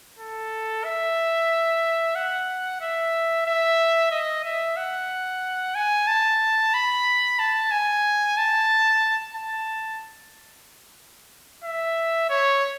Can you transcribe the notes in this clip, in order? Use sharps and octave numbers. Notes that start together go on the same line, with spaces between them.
A4
E5
F#5
E5
E5
D#5
E5
F#5
G#5
A5
B5
A5
G#5
A5
A5
E5
C#5